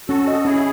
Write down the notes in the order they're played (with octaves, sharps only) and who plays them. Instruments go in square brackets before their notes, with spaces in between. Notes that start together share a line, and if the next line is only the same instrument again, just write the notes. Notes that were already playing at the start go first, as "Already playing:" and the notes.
[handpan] C#4 [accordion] F#4 A4
[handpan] D#5
[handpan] C#4 [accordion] E4 G#4